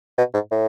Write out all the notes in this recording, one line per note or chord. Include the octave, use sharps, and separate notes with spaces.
B2
G#2
A2